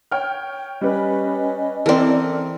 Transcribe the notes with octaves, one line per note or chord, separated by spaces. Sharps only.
C#5 G5 F6
G3 C#4 B4 D#5
E3 C4 A4 A#4 D5